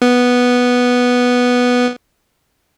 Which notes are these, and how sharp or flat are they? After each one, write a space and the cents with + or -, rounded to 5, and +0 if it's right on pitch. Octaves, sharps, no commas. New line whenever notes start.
B3 -5